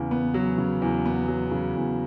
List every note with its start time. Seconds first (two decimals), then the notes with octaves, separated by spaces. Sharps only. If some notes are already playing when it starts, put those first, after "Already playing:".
Already playing: E2 C#3
0.11 B3
0.34 F#3
0.58 C#3
0.82 E2
1.05 B3
1.28 F#3
1.51 C#3
1.76 E2